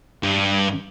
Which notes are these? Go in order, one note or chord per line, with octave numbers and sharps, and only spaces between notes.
G2